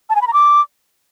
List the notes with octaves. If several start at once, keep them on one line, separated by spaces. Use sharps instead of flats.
A5
G#5
B5
A#5
D6